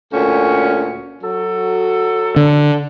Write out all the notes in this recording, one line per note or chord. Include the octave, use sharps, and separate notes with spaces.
D2 A#2 C#4
F#3 A4
D3